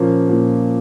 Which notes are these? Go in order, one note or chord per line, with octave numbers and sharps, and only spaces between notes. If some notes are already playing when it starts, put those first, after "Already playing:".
Already playing: A#2 F3 A#3 C#4
A#2